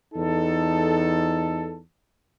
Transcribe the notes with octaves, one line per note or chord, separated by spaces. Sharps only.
E2 D#4 A4